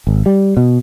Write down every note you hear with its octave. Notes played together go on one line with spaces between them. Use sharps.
G#1
G3
B2